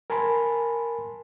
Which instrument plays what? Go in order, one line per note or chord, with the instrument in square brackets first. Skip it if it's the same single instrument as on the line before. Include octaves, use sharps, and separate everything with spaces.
[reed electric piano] A#4 G#5 A5 B5 C6